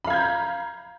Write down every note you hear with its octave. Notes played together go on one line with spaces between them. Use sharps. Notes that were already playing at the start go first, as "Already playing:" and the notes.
F5 A#5 B5 G6 G#6